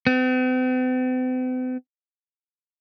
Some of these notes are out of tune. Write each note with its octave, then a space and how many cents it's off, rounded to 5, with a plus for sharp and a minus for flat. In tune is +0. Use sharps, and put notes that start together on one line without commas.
C4 -45